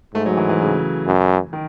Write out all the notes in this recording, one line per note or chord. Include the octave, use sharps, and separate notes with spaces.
G#2 A3
F#3
E3
E3
C#3
F#2
D#3